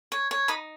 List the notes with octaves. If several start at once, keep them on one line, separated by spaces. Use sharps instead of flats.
C#5
C#5
D#4 B5 D#6